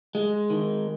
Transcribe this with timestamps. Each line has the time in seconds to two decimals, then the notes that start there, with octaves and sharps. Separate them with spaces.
0.15 G#3
0.50 D#3